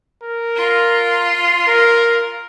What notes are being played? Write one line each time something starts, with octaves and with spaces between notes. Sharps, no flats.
A#4
F4 C6
A#4